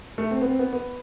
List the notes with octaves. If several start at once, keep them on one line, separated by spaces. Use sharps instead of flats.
A3
C4
B3
C4
B3
B3